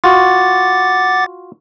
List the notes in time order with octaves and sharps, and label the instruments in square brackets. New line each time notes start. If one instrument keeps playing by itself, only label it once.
[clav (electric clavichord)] F4 F#4 [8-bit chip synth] F#5 D6 A6